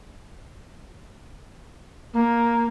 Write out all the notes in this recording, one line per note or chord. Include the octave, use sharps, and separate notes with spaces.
A#3